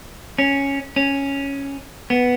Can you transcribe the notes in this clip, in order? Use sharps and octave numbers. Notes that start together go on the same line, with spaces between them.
C#4
C#4
B3